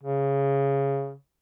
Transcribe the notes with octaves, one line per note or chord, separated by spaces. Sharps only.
C#3